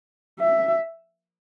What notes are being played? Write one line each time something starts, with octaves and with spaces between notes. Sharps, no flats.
E5